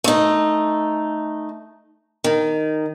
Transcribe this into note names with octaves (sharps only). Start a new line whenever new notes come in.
A3 D#4
D#3